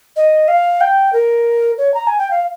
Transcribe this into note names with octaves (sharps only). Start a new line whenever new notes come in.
D#5
F5
G5
A#4
C#5
A#5
G#5
G5
F5